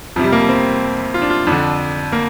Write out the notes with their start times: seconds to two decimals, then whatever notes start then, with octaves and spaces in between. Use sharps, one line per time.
0.16 F2 F3
0.19 C3
0.24 G3
0.32 A#3
0.41 G3
0.49 C4
1.14 F4
1.22 D4
1.30 F4
1.47 F2 D3 D4
2.12 A#3